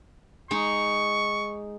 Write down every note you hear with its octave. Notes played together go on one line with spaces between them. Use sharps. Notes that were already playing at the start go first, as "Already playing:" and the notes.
G#3 D#4 C#6